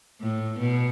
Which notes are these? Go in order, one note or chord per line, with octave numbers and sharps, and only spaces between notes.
A2
B2